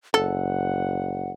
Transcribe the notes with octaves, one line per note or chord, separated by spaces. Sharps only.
F#1 A4 F#5